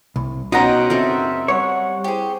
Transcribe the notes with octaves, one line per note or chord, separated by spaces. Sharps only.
C2
B2 C#4 D#4 C5 F#5 G5 A#5
F#1 C4 A4 A#4 E5
G3 C#5 F#5
E4 G4 G#4 C5